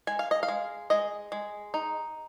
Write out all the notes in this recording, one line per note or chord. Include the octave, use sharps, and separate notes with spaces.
G#3 G#5
F5
D#5
F5
G#3
G#3 D#5
G#3
D#4